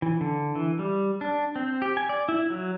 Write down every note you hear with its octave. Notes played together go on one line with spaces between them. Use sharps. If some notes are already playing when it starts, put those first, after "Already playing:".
E3
D3
E3
G3
D4
C4
G4
G#5
D5
E4
F#3